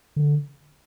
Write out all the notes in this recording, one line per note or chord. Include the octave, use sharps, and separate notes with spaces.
D3